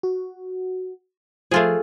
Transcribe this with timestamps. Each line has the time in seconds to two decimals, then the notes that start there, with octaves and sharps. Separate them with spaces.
0.03 F#4
1.51 F3 A3 F4 G#4